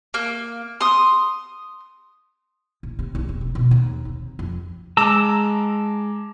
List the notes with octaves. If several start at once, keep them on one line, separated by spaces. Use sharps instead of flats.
A#3
C6 D#6
A1
C3
C2
E1
C4
B2
D#2
C3
F2
G#3 A5 A#5 D6 E6